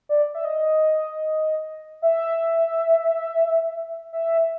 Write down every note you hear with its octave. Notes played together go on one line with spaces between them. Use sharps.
D5
E5
D#5
E5
E5